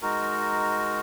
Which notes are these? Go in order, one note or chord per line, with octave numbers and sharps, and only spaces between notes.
G#3 D#4 F#4 A#4